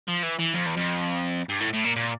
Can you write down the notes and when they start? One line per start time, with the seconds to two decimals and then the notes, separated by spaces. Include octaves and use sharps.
0.08 F3
0.23 E3
0.39 E3
0.54 F2
0.66 E2
0.77 F2
1.49 G2
1.60 A2
1.73 A2
1.84 A#2
1.96 A#2